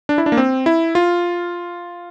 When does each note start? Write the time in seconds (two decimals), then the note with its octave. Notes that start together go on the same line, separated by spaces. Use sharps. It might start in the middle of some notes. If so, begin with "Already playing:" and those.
0.09 D4
0.18 E4
0.26 D4
0.32 A#3
0.37 C4
0.66 E4
0.95 F4